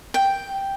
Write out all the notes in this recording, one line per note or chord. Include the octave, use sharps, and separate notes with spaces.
G5